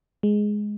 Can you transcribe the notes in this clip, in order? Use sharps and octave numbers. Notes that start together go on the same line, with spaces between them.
G#3